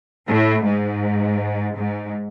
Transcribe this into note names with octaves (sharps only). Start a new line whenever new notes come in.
A2
G#2
G#2